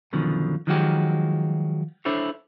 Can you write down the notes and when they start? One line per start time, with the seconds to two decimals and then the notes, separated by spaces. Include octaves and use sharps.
0.13 F#2 B2 D3 D#3 F3
0.67 D#3 F3 F#3 G#3 F#4 G4
2.05 D4 E4 A4 C5 C#5